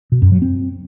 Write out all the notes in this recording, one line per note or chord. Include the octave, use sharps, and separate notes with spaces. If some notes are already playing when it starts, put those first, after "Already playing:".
B2
F#2
F#3
C4